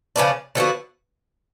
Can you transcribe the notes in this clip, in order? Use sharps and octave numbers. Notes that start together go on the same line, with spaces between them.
C#3 F3 B3 D4
D3 F3 B3 F#4